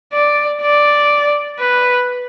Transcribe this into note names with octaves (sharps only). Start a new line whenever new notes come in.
D5
D5
B4